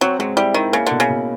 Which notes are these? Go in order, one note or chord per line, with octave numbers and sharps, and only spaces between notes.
F#3 C4
F#3 G#3
G3 E4
D#3 E4
C#3 A#3
B2 D3
C#3
B2